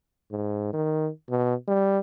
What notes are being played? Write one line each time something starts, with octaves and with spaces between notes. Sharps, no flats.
G#2
D#3
B2
G3